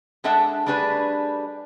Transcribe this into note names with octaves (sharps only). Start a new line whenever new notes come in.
G#3 D4 A4 E5 F#5 A5
G3 A3 D4 G#4 B4